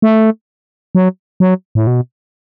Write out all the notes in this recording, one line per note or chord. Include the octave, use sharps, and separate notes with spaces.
A3
F#3
F#3
A2
B2